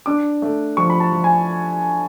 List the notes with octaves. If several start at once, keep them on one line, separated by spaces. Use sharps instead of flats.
D4 D6
A3
F3 C#6
B5
A5
F3
G#5